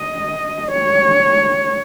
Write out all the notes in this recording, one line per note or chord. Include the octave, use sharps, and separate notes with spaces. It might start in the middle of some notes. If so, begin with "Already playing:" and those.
Already playing: D#5
C#5